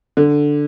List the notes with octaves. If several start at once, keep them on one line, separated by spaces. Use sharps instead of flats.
D3